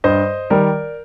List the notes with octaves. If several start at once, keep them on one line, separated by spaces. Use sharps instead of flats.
G2 C5 D#5
D#3 G3 A#4 D5